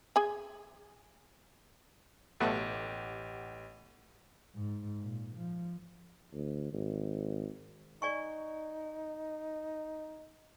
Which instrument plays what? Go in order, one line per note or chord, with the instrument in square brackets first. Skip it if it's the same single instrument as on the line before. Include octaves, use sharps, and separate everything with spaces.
[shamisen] G#4 G#5
[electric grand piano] A1 G4 F#5 [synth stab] B2 F#3 A3
[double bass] G#2
A#2
F3
[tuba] D2
G#1
[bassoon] D#4 [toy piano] D5 G#5 C#6